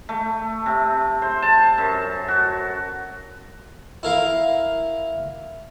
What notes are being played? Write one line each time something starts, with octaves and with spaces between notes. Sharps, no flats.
A3
C3
C5
A5
F#2
F#4
E4 A#4 F5